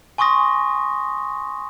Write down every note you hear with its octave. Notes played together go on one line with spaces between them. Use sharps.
G#5 C6 C#6 D#6 A#6